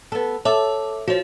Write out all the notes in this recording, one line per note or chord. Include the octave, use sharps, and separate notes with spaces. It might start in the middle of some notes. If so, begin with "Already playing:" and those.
B3 A4
A4 C#5 E5 D6
F3 F#4 C#5